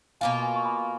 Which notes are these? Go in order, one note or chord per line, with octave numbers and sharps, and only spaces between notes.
B2 A#3 F4 F5 G#5
F5 G#5
C#6
G#5 B5